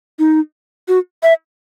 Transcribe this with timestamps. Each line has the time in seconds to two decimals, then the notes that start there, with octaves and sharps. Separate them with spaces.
0.19 D#4
0.88 F#4
1.23 E5